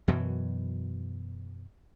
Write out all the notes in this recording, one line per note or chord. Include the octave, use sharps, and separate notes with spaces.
F#2 B2 E3 F#3